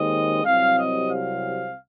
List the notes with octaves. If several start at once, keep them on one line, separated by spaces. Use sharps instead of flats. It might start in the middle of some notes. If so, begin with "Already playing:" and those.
Already playing: D#2 D#3 G#3 C4 D#5
C2 C3 F#3 C4 F5
D#5
F5